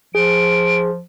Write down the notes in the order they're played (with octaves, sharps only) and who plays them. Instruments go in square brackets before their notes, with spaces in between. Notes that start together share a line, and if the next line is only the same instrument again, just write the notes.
[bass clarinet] F3 [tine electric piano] G#4 [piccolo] D7